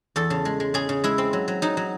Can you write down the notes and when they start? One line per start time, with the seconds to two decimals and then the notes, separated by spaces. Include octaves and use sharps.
0.16 E2 A4
0.30 C#3
0.45 G#3
0.60 G#3
0.74 C#3 G#4
0.89 C#3
1.04 G#3 E4
1.18 C4
1.33 F#3
1.48 F#3
1.62 F#3 D#4
1.77 F#3